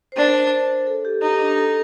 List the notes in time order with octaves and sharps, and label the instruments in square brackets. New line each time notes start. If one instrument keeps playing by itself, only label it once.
[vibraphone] C5
[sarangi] D4 [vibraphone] A#4
[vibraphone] A4
G4
[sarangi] D#4 [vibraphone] G4
[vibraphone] D4
A4